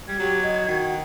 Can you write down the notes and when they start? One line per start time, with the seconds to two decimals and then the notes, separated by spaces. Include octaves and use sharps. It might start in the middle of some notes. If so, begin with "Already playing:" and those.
0.08 G3 G#6
0.19 F#3 G4
0.43 D#5
0.68 D#3 F#4